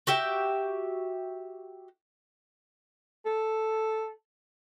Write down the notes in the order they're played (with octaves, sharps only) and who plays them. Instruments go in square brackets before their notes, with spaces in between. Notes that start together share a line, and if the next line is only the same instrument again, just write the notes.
[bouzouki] F#4 G4 E5 G5
[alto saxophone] A4